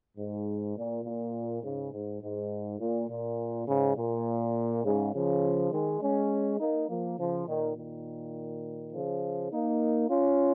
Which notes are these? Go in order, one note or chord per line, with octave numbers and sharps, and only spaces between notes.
G#2
A#2
A#2
G#2 C#3
G#2
G#2
A#2
A#2
G#2 C#3
A#2
G#2 C#3
C#3 F3
D#3 G#3
G#3 C#4
A#3 D#4
F3 A#3
C#3 F3
A#2 D#3
A#2 D#3
C#3 F3
A#3 D#4
C#4 F4